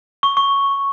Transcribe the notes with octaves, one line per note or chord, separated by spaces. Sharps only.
C#6
C#6